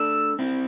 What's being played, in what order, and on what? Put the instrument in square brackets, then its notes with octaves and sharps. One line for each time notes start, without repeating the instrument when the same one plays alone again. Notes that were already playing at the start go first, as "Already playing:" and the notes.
Already playing: [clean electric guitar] A3 D4 [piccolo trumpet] E6
[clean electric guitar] C4 E4